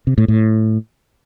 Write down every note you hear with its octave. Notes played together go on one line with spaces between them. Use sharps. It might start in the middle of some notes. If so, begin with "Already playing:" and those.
C3
A2
A2